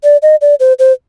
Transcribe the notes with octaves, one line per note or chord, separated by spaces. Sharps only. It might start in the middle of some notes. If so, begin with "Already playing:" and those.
D5
D#5
D5
C5
C5